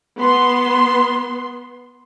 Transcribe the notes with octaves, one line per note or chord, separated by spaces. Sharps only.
B3 C6